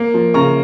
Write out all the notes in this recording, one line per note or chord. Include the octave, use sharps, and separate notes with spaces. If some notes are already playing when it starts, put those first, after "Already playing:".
Already playing: A#3
F3
C#3 A#5 C#6